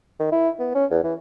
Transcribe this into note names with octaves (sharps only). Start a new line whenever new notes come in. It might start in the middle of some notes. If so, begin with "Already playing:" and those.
D#3
E4
B3
C#4
E2
E3